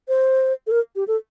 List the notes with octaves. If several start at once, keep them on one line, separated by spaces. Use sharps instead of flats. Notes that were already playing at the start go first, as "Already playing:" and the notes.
C5
A4
A#4
G4
A4